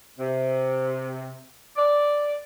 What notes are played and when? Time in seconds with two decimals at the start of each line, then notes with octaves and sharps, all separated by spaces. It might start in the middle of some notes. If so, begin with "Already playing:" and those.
0.19 C3
1.76 D5